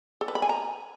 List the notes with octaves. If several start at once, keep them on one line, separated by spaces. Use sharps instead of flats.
A4
B4
B5
G#5
A#5